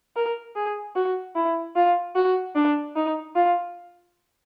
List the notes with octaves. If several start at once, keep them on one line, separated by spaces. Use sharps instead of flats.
A#4
G#4
F#4
E4
F4
F#4
D4
D#4
F4